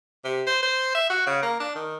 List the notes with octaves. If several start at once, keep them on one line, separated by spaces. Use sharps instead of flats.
C3
C5
C5
E5
F#4
C#3
A#3
D4
D#3